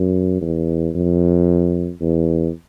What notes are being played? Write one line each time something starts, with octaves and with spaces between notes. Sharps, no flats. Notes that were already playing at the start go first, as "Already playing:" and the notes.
Already playing: F#2
E2
F2
E2